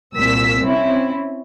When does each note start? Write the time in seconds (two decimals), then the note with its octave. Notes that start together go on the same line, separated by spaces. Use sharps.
0.16 C2 A#2 E6 B6
0.61 C4 C#4 E4